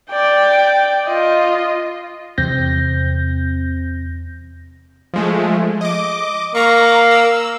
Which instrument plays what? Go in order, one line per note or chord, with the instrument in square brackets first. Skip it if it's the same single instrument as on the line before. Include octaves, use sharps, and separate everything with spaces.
[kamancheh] D5 G5
F4 D#5
[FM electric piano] E2 C3 C4 G6 A#6
[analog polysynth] F3 G#3 A3
D#5 D6
[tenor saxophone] A#3 [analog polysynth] A#5 C#6
[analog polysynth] E6